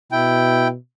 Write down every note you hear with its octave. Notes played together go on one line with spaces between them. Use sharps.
B2 E4 G5